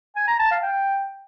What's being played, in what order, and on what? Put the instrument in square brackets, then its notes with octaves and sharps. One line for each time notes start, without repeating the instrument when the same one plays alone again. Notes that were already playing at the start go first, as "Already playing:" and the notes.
[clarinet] G#5
A#5
A5
F5
G5